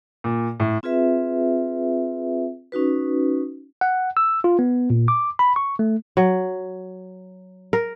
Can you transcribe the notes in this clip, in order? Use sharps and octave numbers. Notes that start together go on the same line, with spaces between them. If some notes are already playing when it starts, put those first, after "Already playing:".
A#2
A2
C4 F4 G#4 B4 E5
C#4 D#4 F#4 B4
F#5
E6
F4
B3
A#2
D6
B5
C#6
A3
F#3
A#4